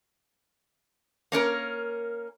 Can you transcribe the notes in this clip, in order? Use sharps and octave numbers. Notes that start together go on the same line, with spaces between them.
A#3 C#4 A#4